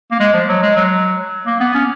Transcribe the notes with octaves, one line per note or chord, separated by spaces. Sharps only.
A#3
G#3
F3
F#3
G#3
F#3
A#3
B3
C#4